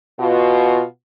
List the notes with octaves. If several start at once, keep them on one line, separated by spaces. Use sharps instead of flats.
B2 F4 F#4